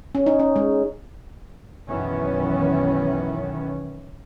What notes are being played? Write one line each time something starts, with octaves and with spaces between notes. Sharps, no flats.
C#4
D#4
C#4
G#3
B1 F#2 D#3 E3 B3 C#4